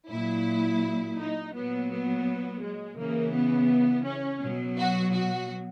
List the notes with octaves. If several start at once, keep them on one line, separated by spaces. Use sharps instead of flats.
A#2 F#3 E4
D#4
A#2 F#3 B3
B3
G#3
C#3 E3 A#3
B3
C#4
B2 F#3
F#4
F#4